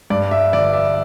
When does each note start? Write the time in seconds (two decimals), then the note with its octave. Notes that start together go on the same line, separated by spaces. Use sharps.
0.10 G2 D5
0.31 E5
0.53 G1 D5
0.73 E5